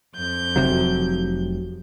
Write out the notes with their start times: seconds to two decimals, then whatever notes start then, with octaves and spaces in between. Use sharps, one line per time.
0.15 F2 G6
0.56 F1 C3 F#3